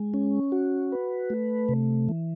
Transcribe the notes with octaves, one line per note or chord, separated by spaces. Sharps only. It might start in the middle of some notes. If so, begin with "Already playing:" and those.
Already playing: G#3
C#4
F#4
B4
A3
C3
E3